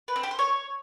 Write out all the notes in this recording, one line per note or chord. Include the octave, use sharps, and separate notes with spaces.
B4
C4
G4
C5
C#5